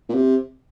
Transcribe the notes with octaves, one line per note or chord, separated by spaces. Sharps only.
A#2
C3